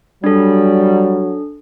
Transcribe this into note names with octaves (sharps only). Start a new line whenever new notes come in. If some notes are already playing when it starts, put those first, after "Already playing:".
F#3 G3 D4 A4